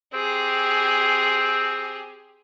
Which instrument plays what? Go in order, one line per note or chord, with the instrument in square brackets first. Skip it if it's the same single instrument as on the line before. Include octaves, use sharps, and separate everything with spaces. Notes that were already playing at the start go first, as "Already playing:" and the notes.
[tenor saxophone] C4 [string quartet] G4 G#4